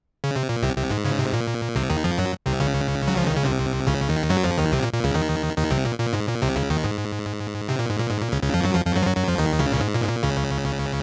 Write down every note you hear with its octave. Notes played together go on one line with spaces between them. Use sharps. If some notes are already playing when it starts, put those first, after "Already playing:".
C#3
C3
A#2
C2 C3
C2 C3
G#2
C#3
C3
A#2
C2 C3
D#2 D#3
F2 F3
F#2 F#3
C2 C3
C#2 C#3
F#3
F3
D#3
C#3
C2 C3
C#2 C#3
D#2 D#3
F#2 F#3
F2 F3
D#2 D#3
C2 C3
A#2
A#2
C#2 C#3
D#2 D#3
D#2 D#3
C2 C3
A#2
A#2
G#2
A#2
C2 C3
C#2 C#3
D#2 D#3
G#2
C3
A#2
G#2
A#2
G#2
A#2
C#2 C#3
C#2 C#3
F2 F3
F#2 F#3
F2 F3
F2 F3
F#2 F#3
F3
F#2 F#3
F#2 F#3
F2 F3
D#2 D#3
C#2 C#3
A#2
G#2
A#2
G#2
A#2
C#2 C#3